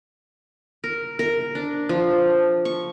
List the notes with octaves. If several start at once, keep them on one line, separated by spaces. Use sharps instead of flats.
A#4
A#4
D4
F3
C#6